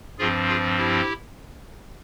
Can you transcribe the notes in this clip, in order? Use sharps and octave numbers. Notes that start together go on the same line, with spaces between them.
G2 F3 C4 F4 G#4
F4 G#4
E4 G4